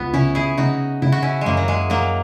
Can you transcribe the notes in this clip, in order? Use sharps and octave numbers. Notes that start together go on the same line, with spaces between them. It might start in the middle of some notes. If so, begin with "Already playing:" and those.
Already playing: C#2 B3
C#3 C#4 E4
E4 G#4
C#3 D#4 F#4
C#3 E4
F#4
C#4 E4
F#2 F#3 G#3 A#3
F#3
G#3
F#2 F#3 A#3